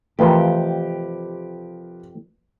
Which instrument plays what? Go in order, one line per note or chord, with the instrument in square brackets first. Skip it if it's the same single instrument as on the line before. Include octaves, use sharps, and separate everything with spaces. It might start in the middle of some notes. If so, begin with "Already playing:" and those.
[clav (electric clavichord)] F2 C3 [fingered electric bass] E3 A3 [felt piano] F3 A#4 B4 [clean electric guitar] G4